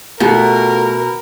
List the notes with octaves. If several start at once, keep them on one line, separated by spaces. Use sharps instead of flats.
B2 A3 F4 G4 A#4